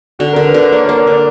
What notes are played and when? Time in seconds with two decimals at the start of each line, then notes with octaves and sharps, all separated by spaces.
0.19 D3 F#4
0.33 D3 A#4
0.46 B4
0.54 D3 D5
0.71 A#3 C#5
0.85 A#3 D5
0.98 C#5
1.07 D3 D5